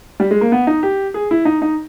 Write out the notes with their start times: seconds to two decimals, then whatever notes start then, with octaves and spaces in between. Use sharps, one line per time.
0.20 G3
0.31 G#3
0.41 A#3
0.52 B3
0.67 D#4
0.83 G4
1.14 G#4
1.31 E4
1.45 D#4
1.62 D#4